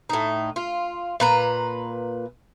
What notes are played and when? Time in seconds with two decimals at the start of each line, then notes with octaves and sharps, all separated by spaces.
0.10 A2 D#4
0.56 F4
1.20 A#2 B4 A#5